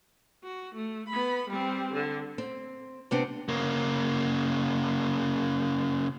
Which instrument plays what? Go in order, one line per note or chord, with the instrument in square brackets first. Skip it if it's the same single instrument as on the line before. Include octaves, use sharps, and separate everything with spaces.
[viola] F#4
A3
B3 B5
G3 C4
D3
[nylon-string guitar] C4
C3 B3 C4 D4
[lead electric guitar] C#3 A#3